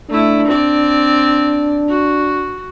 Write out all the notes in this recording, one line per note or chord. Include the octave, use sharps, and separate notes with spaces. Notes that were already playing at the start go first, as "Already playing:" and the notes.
A3 D4 E4
C4 D5
F#4